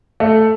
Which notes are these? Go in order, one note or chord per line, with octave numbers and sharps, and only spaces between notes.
A3